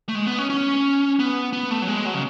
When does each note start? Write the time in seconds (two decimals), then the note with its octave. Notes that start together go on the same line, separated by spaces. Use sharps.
0.09 A3
0.15 G#3
0.27 B3
0.38 C#4
0.50 C#4
1.19 B3
1.53 B3
1.70 A3
1.82 F#3
1.88 G#3
2.05 F#3
2.14 C#3